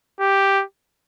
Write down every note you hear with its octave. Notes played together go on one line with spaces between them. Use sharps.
G4